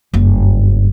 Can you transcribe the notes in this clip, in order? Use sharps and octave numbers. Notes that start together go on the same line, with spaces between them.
F#1 G2